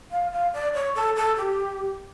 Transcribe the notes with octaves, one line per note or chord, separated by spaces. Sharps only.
F5
F5
D5
C#5
A4
A4
G4